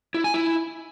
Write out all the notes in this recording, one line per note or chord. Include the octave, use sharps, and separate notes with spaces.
E4
G#5
E4